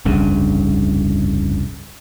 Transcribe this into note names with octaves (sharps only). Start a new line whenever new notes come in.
F1 C2 G2 C#3